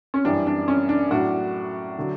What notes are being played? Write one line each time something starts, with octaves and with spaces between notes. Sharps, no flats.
C#4
F#2 E3 G3 D4
D4
C#4
D4
A2 F#3 D4 F#4
D3 F#3